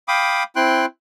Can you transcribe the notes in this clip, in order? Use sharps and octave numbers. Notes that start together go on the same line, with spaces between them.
F5 G5 B5 D6 D#6
C4 E4 G5 C6 F#6